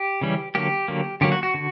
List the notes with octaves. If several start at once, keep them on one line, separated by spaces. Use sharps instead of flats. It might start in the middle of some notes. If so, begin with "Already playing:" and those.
Already playing: G4
C#3 E3 G3 C#4
D3 F#3 A#3 G4
D3 F#3 A#3
D3 F#3 A#3 G4
F#4
F#4
D3